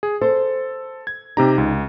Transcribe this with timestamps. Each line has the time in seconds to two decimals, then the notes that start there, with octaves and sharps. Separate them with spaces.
0.03 G#4
0.21 A4 C5
1.07 G#6
1.37 C3 D#4 G4 A#5
1.58 C#2